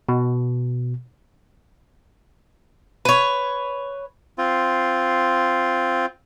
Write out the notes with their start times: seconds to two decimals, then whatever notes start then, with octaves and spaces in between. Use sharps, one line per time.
0.09 B2
3.05 B4 C#5
4.38 C4 F4